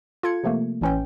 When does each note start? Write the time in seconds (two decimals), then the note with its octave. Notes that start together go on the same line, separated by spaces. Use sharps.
0.23 F4 A4 G#6 C#7
0.44 C3 F3 A3 A#3
0.81 A1 A2 C#4 B4 G5